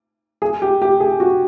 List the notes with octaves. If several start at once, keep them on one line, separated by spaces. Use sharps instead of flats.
G#4
G4
G4
G#4
F#4